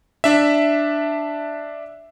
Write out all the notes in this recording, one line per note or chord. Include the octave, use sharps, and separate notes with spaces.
D4 E5